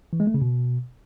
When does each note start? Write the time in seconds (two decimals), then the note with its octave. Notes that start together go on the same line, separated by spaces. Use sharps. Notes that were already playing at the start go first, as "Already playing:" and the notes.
0.13 E3
0.20 G#3
0.27 A3
0.34 C#3
0.42 B2